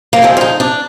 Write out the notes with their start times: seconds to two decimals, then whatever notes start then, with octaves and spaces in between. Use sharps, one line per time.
0.13 A#3
0.22 D2 D3 F3 G#3 C4
0.37 F4
0.41 D#4
0.60 D4